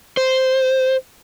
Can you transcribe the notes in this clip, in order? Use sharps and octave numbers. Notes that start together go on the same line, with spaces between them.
C5